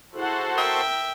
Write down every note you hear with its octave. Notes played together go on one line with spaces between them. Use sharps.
E4 F#4 G#4 A4 C5 F#5
A#4 E5 G5